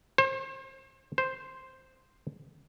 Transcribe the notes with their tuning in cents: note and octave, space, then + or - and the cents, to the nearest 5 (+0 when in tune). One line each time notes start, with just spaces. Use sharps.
C5 +35
C5 +0